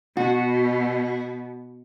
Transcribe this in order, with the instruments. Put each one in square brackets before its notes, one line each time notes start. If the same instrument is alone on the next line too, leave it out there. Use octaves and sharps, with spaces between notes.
[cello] B2 [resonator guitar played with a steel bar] F#4